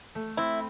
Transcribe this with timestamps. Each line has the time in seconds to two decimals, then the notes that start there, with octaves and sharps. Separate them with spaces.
0.15 A3
0.37 C4 E4